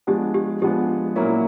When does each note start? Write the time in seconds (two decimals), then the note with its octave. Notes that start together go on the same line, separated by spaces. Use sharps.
0.07 F3 G#3 B3 D4 G4
0.34 G4
0.62 F3 G#3 B3 D4 G4
1.16 A#2 F#3 A#3 C#4 E4